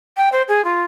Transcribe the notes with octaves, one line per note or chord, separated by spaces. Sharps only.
G5
C5
G#4
F4